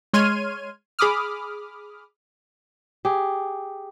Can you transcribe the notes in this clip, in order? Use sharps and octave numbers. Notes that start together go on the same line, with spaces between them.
G#3 C#5 C6 F6 G#6 D#7
G#4 B5 D6 D#6 F6
G4 G#4